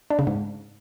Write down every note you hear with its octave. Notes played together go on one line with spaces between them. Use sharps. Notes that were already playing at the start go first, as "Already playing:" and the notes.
D4
C#3
G#2